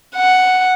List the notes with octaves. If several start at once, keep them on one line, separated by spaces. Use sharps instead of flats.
F#5